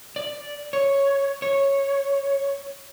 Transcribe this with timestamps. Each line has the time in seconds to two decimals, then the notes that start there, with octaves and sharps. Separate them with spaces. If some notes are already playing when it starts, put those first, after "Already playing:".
0.16 D5
0.73 C#5
1.42 C#5